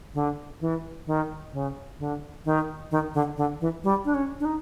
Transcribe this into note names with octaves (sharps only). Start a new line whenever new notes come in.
D3
E3
D#3
C#3
D3
D#3
D#3
D3
D3
E3
G3
D4
C#4
D4
D#4